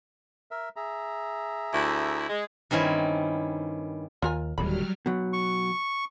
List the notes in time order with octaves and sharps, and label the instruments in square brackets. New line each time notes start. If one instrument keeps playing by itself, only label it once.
[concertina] A#4 E5
G#4 E5 A#5
[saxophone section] D2 E4
G#3
[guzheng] G2 D#3 C4 C#4 E4
[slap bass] D#2 [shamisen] F4 A#4 G#5
[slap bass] D1 D#2 D3 [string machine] F#3 G3 F6 [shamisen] B5
[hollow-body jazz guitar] B2 F#3
[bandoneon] C#6